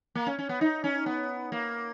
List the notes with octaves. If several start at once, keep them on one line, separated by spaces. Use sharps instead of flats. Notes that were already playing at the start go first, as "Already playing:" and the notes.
A#3
C#4
C#4
B3
D#4
C#4
B3
A#3